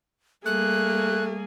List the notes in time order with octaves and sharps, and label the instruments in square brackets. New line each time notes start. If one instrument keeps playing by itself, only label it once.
[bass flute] G3 [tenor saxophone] A3 [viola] A#3 G#4 [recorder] F#6